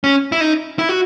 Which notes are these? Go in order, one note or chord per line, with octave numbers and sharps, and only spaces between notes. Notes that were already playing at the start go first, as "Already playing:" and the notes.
C#4
E4
D#4
E4
F#4